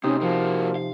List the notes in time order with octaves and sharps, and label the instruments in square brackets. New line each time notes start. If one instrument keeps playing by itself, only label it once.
[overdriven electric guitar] F2 A2 [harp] C3 D#4 D#6 [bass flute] C#4
[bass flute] F3 [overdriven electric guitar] A#3 F#4
[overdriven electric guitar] F5